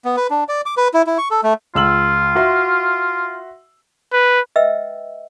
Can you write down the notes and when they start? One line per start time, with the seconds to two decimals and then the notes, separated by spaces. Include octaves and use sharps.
0.05 B3
0.17 B4
0.30 D4
0.48 D5
0.66 D6
0.77 B4
0.94 E4
1.07 E4
1.18 C#6
1.31 A4
1.43 A3
1.75 C#2 F4 E6 F#7
2.35 F#4 E5 C6
4.13 B4
4.56 B4 D#5 E5 G5 E6